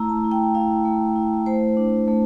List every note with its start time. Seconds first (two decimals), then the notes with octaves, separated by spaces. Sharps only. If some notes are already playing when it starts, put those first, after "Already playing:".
Already playing: A3 E4 A#5 E6
0.09 A5
0.24 E4
0.31 G5
0.55 E4 F5
0.85 A3
1.16 E4
1.46 A3 C5
1.77 D4
2.08 A3